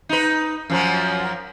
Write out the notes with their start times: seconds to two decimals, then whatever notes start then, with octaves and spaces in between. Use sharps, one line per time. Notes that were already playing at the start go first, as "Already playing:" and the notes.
0.09 D#4 B4
0.70 F#2 F3 F#3